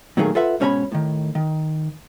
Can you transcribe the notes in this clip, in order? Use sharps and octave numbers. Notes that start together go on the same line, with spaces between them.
A#2 D#3 F#3 A3 A#3 G#4
F4 A4 B4 E5 F#5
G#2 B2 C#4 C#5 A#5 B5
A2 D#3
D#3